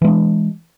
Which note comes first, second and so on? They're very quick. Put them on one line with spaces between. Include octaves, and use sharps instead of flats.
E3 G#3 D4